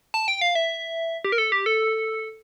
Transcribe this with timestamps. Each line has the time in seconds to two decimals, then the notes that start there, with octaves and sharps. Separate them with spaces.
0.14 A5
0.28 G5
0.41 F5
0.55 E5
1.25 G4
1.32 A#4
1.38 A4
1.52 G4
1.66 A4